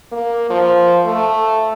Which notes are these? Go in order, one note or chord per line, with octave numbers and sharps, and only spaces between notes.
A#3
F3
A3